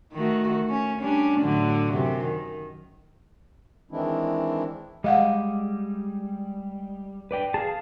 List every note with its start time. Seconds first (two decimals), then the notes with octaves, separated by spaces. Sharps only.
0.13 D#3 A3 F#4
0.70 C#4
1.01 G3 C#4 D4
1.40 A2 D3 F#3
1.93 F#2 C3
2.25 D#3
3.91 D#3 E3 G#3 C4 D4 E4
5.04 G3 G#3 D#5 F5 F#5
7.31 B4 D5 G5
7.54 G#4 F5 A5